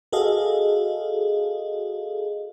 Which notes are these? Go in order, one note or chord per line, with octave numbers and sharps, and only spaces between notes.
F#4 G#4 A4 D#5 F5